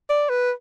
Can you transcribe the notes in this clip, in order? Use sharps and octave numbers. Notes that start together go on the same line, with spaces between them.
D5
B4